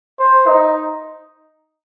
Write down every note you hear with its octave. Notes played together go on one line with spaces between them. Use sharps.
C5
D#4